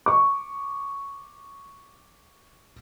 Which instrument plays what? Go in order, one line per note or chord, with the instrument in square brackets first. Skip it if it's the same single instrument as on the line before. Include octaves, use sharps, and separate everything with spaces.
[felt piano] C#6 D6